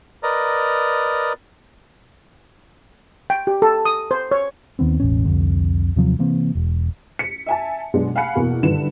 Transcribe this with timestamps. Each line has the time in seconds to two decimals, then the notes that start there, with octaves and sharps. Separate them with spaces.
0.23 A#4 B4 D5 D#5 A#5
3.30 G5
3.47 G4
3.62 A4
3.85 D#6
4.11 C5
4.31 C#5
4.79 D#2 D#3 B3 C4
5.00 E1 A1 C#4
5.25 C2 F2 D3
5.96 D#2 C3 F3 F#3
6.19 C3 E3 A#3 C4
6.55 E1
7.19 B6 C#7
7.46 E5 G#5 A5
7.94 B2 F#3 G#3 B3 D4
8.16 F5 F#5 G#5 B5 F#6 C#7
8.36 E2 B2 A#3
8.63 G2 D3 D#3 E4 B4 E7